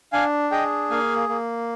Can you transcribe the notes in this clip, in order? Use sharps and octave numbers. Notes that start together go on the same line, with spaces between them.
D4 F5 G#5
G#4 D#5 G5
A#3 F5 G#5
A#3